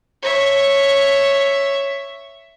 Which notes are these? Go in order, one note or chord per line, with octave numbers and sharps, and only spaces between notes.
C#5 E5